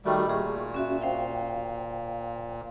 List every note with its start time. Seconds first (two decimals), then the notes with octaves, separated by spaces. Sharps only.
0.06 D#3 G3 A3 F#4
0.27 A#2 G#4 C#6
0.74 C#4 F#4 E5
1.01 C5 F5 G5